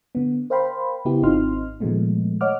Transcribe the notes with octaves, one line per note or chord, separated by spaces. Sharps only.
D3 B3
A#4 C5 F5 G5 B5 C6
C#3 B3 E4 G4
G#1 C4 D#4 F4 C6 F6
A#2 D#3 F3 G#3 A3 B3
C#5 D#5 F#5 D6 F6